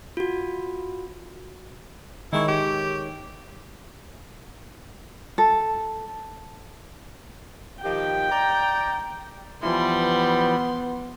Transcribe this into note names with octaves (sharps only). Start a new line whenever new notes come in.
F4 F#4
D#3 G#3 E4 C#5
G4
A4
D#3 F3 G4 G5
D5 A#5
E3 F3 G3 B3 E4 C6